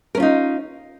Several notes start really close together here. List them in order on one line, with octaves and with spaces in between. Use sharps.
A#4 C#4 F4 D#4